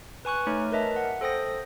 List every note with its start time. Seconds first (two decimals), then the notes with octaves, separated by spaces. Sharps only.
0.25 B4 G#5 C#6 F#6
0.47 A3 D#4 C#5 F6
0.72 A#4 B4 D#5 E5 A5
0.96 F#5
1.21 A4 C5 G5 D#6 A#6